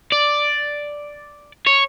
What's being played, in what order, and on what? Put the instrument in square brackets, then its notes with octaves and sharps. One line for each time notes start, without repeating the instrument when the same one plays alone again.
[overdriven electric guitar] D5
C#5